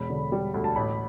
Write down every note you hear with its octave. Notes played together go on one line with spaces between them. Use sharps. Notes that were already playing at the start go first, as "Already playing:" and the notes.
Already playing: E1 B5
D3
G3
D2
A5
A1 B5